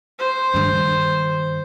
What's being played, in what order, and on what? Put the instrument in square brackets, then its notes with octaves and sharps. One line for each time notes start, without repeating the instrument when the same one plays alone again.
[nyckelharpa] C5
[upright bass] G2 D#3